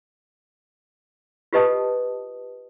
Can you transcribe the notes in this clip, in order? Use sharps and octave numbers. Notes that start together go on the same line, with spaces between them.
F4 G4 B4 D#5 A5 D#6